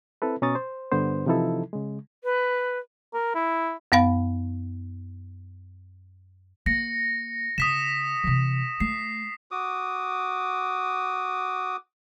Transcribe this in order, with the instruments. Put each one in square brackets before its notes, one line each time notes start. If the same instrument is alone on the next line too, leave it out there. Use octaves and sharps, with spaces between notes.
[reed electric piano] C4 E4 A4 B4
B2 C#4 A#5 C#6 D#6 A6
C5
G2 D3 B3 C5
C3 E3 F3 D#4 E4 A4
C#3 G#3
[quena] B4
[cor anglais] A#4
E4
[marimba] F#2 B3 F5 B5
[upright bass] A#3 [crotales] A#6 C#7
[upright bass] C#3 [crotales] D#6 B6 E7
[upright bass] C3 E3
[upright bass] A3 [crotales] C7
[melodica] F#4 D6 D#6